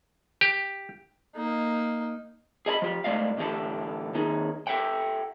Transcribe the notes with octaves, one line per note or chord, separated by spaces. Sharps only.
G4
A#3 D#4
G#4 D#5 A5 B5
F3 G4
G#2 C#3 A3 D5 D#5 F5
A2 D3 E3 G4 A4
D#2 D#4 G#4
G4 A4 E5 F#5 G5